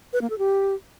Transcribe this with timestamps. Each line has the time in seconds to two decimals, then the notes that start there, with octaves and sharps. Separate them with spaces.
0.13 B4
0.21 A#3
0.30 A4
0.38 G4